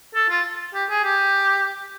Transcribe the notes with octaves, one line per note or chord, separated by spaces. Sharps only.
A4
F4
G4
G#4
G4